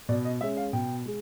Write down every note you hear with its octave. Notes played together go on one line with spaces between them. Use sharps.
B2 D5
D#5
G#3 C#4 E5
F5
B2 G5
G#3